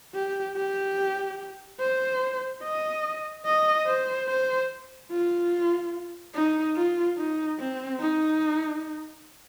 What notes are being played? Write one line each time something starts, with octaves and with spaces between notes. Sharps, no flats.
G4
G4
C5
D#5
D#5
C5
C5
F4
D#4
F4
D#4
C4
D#4